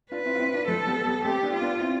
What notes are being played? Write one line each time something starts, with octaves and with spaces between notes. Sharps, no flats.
D4 F4 B4
C4 E4
F4
C4 E4
D4 F4
F3 A3 A4
G3 B3
G3 B3
A3 C4 G4
B3 D4
F4
B3 D4
C4 E4